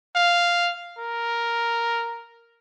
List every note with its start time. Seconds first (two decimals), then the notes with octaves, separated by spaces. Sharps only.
0.15 F5
0.98 A#4